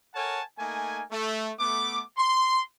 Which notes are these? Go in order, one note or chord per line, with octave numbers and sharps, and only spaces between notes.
A4 A#4 C#5 F#5 G#5 A5
A3 A#3 D#4 G#5
A3
A3 B3 D6
C6